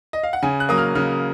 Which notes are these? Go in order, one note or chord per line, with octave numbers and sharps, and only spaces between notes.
D#5
F5
F#5
C#3 G#5
F#6
F#3 A#3 D#6
F6
C#3 F6